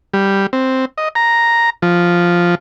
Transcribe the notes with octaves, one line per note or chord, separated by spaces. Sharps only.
G3
C4
D#5
A#5
F3